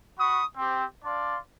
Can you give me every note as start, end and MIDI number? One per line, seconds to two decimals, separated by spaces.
0.18 0.43 66
0.18 0.43 83
0.18 0.43 85
0.18 0.43 87
0.57 0.85 60
0.57 0.85 67
1.04 1.37 62
1.04 1.37 74
1.04 1.37 77
1.04 1.37 84